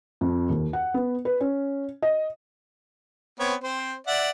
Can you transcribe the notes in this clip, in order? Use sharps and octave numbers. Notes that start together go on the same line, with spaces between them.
F2
D#2
F#5
B3
B4
C#4
D#5
B3 C4 C#5
C4 C5
D5 E5 F#5